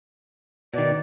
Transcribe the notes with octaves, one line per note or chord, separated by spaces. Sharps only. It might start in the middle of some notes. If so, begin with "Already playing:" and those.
B2 D#3 D5